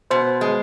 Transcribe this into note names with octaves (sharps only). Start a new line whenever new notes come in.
B2 C5
G#3